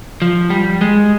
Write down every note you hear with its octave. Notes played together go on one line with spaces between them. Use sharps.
F3
G3
G#3